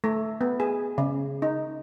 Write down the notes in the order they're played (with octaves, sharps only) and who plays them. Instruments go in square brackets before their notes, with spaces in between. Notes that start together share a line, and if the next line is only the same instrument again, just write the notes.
[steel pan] A3
B3
G#4
C#3
D#4